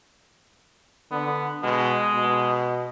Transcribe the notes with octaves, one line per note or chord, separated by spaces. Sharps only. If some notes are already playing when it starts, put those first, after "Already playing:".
D3 B3
B2 G#3
B2